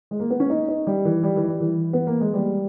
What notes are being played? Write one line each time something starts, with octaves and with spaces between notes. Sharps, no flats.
G#3
A#3
B3
C#4
D#4
D#4
G3
E3
G3
E3
G3
E3
B3
A#3
G#3
G3